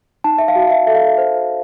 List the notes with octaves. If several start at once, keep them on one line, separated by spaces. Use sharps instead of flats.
D#4 A5
E5
F5
F#4
F5
E5
A4 E5
F5
C5